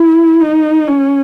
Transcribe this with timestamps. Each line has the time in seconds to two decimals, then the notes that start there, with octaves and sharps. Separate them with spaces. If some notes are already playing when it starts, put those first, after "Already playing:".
Already playing: E4
0.40 D#4
0.87 C#4